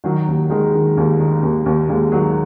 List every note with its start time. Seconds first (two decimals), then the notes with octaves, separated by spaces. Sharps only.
0.04 D#3 F#3
0.28 D#2
0.50 D#3 G#3
0.74 D#3
0.97 D#2
1.20 D#3
1.43 D#2
1.66 D#2
1.89 D#2 G#3
2.12 D#3 F#3